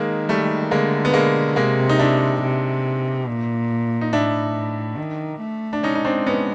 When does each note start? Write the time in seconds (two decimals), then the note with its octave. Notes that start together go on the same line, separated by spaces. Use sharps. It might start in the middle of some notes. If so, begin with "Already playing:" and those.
Already playing: D#3 G#3 A#3
0.29 G3 A3
0.71 D3 G#3 A#3
1.05 B3
1.14 G#3 A#3
1.56 C3 G#3 A#3
1.89 D#4
1.99 D4 E4
2.42 C3
3.27 A#2
4.01 D#4
4.12 A2 D4 E4
4.97 D#3
5.41 A3
5.73 D4
5.83 G#3 C#4 D#4
5.95 D#4
6.05 C4 D4
6.26 B3 C#4